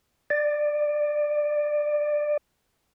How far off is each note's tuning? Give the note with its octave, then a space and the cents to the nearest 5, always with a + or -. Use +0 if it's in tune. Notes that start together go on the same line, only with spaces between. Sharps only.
D5 +15